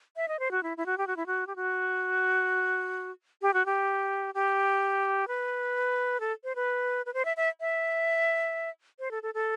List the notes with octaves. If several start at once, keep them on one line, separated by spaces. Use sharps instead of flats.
E5
D#5
C5
F#4
E4
E4
F#4
G4
F#4
E4
F#4
G4
F#4
G4
F#4
G4
G4
B4
A4
C5
B4
B4
C5
E5
E5
E5
C5
A4
A4
A4